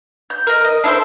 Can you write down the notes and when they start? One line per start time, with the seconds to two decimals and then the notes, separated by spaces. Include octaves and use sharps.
0.30 G6
0.47 A#4 D#5
0.65 D#5
0.84 D4 E4 A4 C5